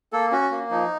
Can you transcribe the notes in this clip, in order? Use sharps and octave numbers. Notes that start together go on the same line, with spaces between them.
A#3 A4
C#4 F#4
A#3
F3 D#4